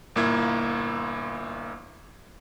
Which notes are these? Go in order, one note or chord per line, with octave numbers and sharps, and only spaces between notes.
G1 A#2 A#3 E4 G#6